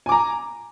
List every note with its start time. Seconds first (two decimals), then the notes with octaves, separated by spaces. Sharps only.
0.06 G#5
0.09 D6
0.12 A#5